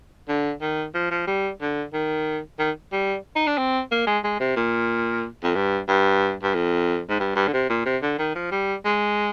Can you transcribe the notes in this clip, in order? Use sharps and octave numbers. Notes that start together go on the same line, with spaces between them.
D3
D#3
F3
F3
G3
D3
D#3
D#3
G3
D#4
D4
C4
A#3
G#3
G#3
C3
A#2
F2
G2
G2
G2
F2
G#2
G2
G2
D3
C3
A#2
C3
D3
D#3
F3
G3
G#3